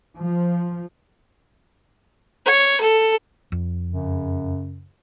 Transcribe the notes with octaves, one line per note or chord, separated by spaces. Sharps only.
F3
C#5
A4
F2
F#2 C#3